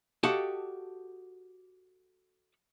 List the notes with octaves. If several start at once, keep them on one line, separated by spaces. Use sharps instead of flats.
F#4 G4 A4 D#5 F5 A5